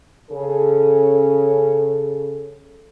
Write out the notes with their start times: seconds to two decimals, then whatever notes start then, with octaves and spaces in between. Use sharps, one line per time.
0.31 C#3 C#4 G#4 A4